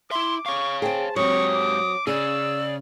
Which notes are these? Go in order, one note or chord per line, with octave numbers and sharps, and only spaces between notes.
E4 E5 C6 D6
C#5 F5 C#6
G#4 C5 G5 A5
G#2 F#3 C4 G4 C#6 D#6
D6
C#3 G#4 D5 E6